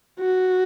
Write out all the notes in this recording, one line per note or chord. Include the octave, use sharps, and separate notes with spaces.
F#4